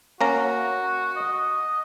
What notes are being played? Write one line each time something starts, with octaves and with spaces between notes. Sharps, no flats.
A#3 C#4 F#4 A#5
D#5